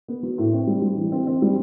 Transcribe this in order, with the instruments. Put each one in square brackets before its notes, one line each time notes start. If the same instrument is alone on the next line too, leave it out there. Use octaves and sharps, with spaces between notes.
[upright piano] B3
F#3
A2
C4
G3
G3
E3
C4
C4
G3